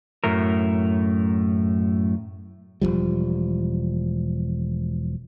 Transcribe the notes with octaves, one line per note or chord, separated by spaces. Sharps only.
F#2 A2 A3 A#4
E1 C#2 F3 G3